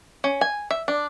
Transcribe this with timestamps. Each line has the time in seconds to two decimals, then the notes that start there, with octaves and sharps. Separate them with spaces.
0.24 C#4
0.41 G#5
0.71 E5
0.88 D4